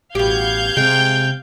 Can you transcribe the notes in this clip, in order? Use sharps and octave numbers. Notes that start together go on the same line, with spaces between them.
A1 B2 G4 F5 G6 G#6
C3 G#3 G5